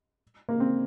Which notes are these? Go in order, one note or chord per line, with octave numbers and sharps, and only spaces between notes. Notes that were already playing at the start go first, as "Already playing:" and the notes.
A#3
C4